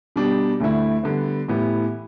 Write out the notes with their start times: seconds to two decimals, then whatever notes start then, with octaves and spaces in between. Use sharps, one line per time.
0.16 B2 G3 D4 G4
0.60 D2 D3 A3 E4
1.04 D3 G3 B3
1.48 A2 E3 B3 E4 G4